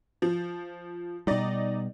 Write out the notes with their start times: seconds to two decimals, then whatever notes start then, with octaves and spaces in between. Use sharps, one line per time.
0.22 F3
1.27 B2 G3 D#4 D5 D#5